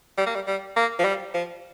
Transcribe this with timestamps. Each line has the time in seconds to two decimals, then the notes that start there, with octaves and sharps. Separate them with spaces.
0.18 G3
0.26 A#3
0.35 G3
0.47 G3
0.76 A#3
0.99 F3
1.05 G3
1.34 F3